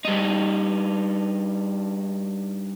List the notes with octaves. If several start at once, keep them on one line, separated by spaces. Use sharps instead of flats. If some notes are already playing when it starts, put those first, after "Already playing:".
G2 D#4